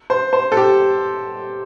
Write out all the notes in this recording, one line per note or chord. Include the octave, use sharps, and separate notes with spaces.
C5
C5
A4
G4